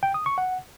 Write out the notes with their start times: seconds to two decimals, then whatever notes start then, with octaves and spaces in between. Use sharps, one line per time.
0.03 G5
0.14 D#6
0.26 C#6
0.38 F#5